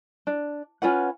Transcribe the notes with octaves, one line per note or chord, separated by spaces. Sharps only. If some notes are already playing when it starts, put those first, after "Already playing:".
D4
C#4 F4 B4 F#5